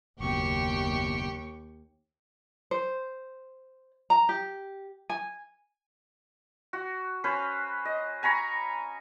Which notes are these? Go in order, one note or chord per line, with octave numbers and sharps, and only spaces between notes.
F#1 D#2 B2 B3 G4 G5 C#6
C5
A#5
G4
G#5
F#4
C#4 B4 C5
D#5
G#5 A#5 B5 C#6